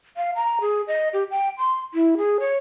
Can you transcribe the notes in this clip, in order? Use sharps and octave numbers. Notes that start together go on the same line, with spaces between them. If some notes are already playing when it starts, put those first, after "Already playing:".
F5
A#5
G#4
D#5
G4
G5
C6
E4
G#4
C#5